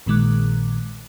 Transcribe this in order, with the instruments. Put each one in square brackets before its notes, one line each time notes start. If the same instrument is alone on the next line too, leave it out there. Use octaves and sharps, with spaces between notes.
[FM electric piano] A#1 A#2 D#3 G#3 D6 F#6